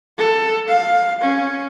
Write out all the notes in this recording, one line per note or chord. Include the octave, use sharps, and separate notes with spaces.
A4
F5
C#4